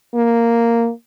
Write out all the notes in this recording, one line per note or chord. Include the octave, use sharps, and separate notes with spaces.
A#3